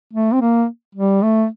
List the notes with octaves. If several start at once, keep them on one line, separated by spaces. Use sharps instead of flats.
A3
C4
A#3
G3
A3